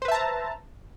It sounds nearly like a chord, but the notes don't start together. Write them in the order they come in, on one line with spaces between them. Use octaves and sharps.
C5 B4 E5 A5 A#5